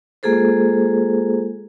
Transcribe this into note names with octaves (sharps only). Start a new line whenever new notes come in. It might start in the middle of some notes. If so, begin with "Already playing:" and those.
G#3 A#3 F4 G#4 A4 C5